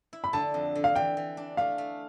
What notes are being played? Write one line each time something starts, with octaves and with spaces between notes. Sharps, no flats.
E4
B5
D3 A5
F2
D3
F5
E3 G5
E3
D4
A3 F5
A3